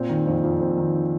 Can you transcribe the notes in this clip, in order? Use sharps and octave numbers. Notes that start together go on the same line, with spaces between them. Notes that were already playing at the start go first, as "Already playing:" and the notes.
Already playing: A#2 C4
D#3
F2
F2
C4
D#3